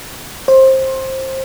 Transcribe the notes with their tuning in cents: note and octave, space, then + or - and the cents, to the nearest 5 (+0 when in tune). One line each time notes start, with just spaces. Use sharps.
C5 +20